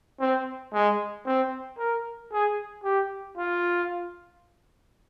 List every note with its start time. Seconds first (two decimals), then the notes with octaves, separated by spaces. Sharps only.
0.20 C4
0.73 G#3
1.26 C4
1.78 A#4
2.32 G#4
2.84 G4
3.37 F4